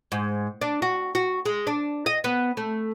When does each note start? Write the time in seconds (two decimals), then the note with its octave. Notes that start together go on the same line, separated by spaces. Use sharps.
0.12 G#2
0.61 D4
0.82 F#4
1.15 F#4
1.46 G#3
1.67 D4
2.06 D#5
2.24 B3
2.57 A3